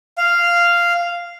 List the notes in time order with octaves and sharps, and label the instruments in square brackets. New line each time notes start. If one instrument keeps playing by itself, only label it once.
[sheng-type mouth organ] F5